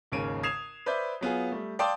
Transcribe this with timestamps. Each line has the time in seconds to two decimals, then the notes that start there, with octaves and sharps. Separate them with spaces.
0.12 G#1 D#2 C#3 C#5 D7 D#7
0.43 D#6 G#6 C7 E7 F7
0.86 B4 C5 D5 E5 G6
1.21 F#3 B3 F4 G#4
1.52 G3 A3
1.79 D5 F5 G5 A5 C6 D#6